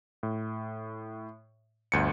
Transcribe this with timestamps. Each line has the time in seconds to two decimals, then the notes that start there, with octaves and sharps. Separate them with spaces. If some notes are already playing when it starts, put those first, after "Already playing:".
0.23 A2
1.92 G1 D2 C#7